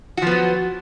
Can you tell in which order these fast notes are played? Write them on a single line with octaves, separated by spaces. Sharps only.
F#4 F3 B3 F#3